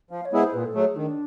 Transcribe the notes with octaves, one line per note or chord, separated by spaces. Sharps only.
F3 F5
C#5
G#3 B3 E4 G#4
C5
A#2 B4
A4
F#3 A3 G#4
D#3 D4